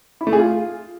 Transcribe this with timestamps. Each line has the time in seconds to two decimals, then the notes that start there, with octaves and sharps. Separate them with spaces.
0.21 E4
0.27 A3
0.33 G#4
0.39 F4